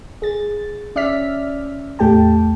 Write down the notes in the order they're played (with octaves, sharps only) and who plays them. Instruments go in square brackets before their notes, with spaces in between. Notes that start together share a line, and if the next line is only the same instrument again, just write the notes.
[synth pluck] G#4 A6
C#4 D5 E5 F6 B6
E2 A2 A3 G4 G5 A5